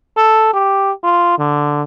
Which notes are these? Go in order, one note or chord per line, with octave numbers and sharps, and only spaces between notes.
A4
G4
F4
D3